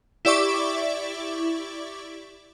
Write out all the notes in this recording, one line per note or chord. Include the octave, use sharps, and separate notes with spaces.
E4 G4 D5 E5 C#6 D6